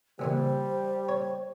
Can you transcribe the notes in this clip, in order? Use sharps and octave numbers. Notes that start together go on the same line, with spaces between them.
C#2 A#2 E3 G3 C5
C#5